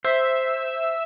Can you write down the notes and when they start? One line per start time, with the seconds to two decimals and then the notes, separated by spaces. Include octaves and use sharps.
0.05 C5 E5